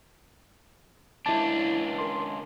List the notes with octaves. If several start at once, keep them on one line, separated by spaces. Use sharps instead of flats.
C#2 D4 E4 A5
A#4 C6